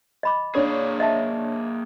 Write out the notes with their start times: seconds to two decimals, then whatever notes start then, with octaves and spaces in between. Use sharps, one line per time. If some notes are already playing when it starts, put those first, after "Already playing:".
0.23 D#5 B5 D6
0.55 A#3 D4 G#4 C#5
1.00 D#5 E5 A5